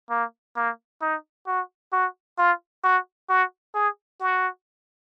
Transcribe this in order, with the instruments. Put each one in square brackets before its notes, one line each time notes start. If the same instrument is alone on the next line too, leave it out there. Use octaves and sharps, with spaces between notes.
[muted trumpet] A#3
A#3
D#4
F#4
F#4
F4
F#4
F#4
G#4
F#4